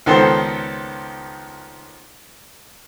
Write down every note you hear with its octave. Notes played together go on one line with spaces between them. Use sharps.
C#2 D#3 B3 A4 C5 C6